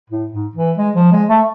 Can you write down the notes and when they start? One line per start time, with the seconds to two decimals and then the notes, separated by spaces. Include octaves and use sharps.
0.10 A2
0.32 G#2
0.55 E3
0.78 G#3
0.95 F3
1.12 G#3
1.29 A3